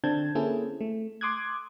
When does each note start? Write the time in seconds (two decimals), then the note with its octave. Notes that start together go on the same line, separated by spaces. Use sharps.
0.04 D3 C4 D4 A5 G6 G#6
0.35 A#3 C4 C#4 E4 G#4 A4
0.81 A3
1.21 C6 D6 D#6 F#6 G#6